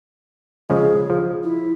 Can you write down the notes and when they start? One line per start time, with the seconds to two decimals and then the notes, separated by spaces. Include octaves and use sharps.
0.70 C#3 F3 G#3 G#4
1.10 F3
1.43 E4